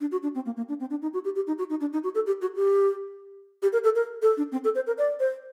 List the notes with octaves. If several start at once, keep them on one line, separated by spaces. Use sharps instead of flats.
D4
F#4
D4
C4
A#3
A#3
D4
C4
D4
D#4
F#4
G4
G4
D#4
F#4
D#4
D4
D#4
F#4
A4
G4
F#4
G4
G4
A#4
A4
A#4
A4
D4
C4
A4
C5
A#4
D5
C5